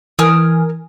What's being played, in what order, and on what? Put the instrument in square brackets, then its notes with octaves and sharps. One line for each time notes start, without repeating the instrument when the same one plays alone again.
[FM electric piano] E3 G#5 [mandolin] A#4 D#6 F6